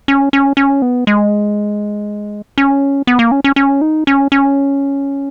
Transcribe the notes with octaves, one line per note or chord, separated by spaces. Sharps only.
C#4
C#4
C#4
B3
G#3
C#4
B3
A#3
C#4
C#4
C#4
D#4
C#4
C#4